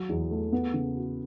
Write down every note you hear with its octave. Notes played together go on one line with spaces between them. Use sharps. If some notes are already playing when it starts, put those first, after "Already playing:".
Already playing: F#3
E2
A3
B3
C#3
F#4